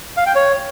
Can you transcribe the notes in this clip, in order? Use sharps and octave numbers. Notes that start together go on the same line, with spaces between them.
F5
G5
C#5